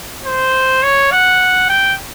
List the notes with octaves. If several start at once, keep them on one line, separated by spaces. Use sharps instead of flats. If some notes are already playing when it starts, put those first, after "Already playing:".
C5
C#5
F#5
G5